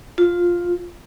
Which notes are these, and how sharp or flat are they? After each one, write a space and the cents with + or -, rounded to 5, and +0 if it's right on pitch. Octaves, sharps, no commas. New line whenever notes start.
F4 +5